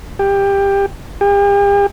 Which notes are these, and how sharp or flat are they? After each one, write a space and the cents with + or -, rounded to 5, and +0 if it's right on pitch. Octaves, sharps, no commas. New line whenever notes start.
G4 +20
G4 +45